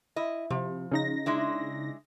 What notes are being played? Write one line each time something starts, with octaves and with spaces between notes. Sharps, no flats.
E4 D#5
C3 F3
C#3 D#4 A#6
G#3 D4 E4